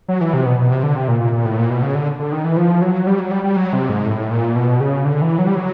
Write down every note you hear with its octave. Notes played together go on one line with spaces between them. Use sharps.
F#3
E3
C3
B2
B2
C3
D3
C3
A#2
A#2
A#2
A2
A#2
B2
C#3
D3
D3
D#3
E3
F3
F#3
G3
F#3
G3
G3
F#3
C3
G#2
A2
A#2
B2
C#3
D3
E3
F#3
G3
F#3